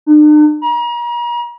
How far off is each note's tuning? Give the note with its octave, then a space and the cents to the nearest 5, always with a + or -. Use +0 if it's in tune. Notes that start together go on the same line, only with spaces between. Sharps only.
D4 +45
A#5 +40